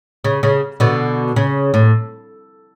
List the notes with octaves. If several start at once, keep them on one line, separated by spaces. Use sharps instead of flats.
C#3
C#3
B2 D3
C#3
A2